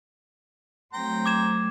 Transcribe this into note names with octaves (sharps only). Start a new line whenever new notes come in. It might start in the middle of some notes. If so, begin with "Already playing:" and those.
F#3 A3 C4 G5 A#5 C6
D6 G#6 E7